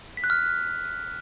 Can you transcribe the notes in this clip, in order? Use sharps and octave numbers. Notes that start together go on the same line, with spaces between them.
B6
F#6
F6